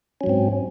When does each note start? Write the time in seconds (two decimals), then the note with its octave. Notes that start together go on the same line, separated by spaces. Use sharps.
0.21 C#4
0.24 F#3
0.26 G#2
0.29 C4